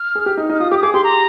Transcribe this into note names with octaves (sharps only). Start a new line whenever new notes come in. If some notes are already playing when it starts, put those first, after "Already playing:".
Already playing: F6
G#4
G4
D#4
D#4
F6
F4 D#6
G4 D6
D#6
G#4 D6
G4 C6
A#5